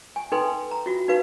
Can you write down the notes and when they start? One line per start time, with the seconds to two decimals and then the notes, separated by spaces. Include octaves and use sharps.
0.16 G#5
0.32 D#4 A4 B4 G5 G#5 C6
0.71 A#5
0.86 F4 F#4
1.08 D#4 F#4 B4 F5